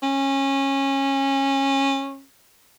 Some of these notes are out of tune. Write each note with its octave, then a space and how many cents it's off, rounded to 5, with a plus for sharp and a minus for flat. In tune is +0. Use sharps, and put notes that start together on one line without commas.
C#4 -20